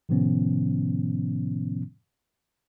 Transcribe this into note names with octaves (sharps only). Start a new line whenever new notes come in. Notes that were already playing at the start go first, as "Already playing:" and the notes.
A2 C3 D#3 F3 B3 C#4